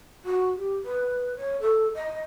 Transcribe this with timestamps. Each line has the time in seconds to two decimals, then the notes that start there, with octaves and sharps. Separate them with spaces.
0.25 F#4
0.56 G4
0.84 B4
1.36 C#5
1.60 A4
1.94 D#5